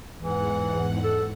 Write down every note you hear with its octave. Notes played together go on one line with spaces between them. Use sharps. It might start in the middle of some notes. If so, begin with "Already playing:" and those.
E2 G#2 E3 F#5
A4